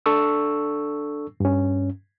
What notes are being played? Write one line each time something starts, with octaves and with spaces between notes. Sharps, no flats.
D4 A4 C#6 E6
G2 C#4